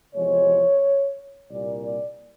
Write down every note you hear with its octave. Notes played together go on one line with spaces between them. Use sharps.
E2 C3 F3 G#3 C#5
C2 A#2 G3 A#3 D5
D5